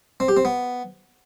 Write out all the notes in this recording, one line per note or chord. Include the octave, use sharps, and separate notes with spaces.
C4
G4
C4
B3